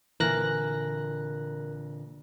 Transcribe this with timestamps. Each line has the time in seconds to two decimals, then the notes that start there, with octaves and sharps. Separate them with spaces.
0.20 A#2 D3 E3 A#3 A#4 G#5 F#6 A#6